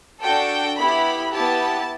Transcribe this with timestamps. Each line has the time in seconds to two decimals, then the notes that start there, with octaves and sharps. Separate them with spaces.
0.22 D4 F#4 A4 G5
0.78 B3 E4 G4 B5
1.33 B3 E4 G4 A5